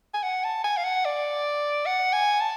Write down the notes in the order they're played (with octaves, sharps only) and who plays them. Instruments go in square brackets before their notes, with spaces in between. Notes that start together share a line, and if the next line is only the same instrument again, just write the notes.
[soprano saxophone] G#5
F#5
A5
G#5
F5
F#5
D5
F#5
G#5
A5